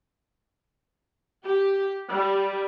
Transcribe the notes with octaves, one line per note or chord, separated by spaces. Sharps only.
G4
G3